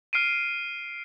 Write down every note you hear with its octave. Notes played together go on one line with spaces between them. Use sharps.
F6 C7 D7 D#7